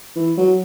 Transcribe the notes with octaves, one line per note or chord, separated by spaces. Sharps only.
E3
F#3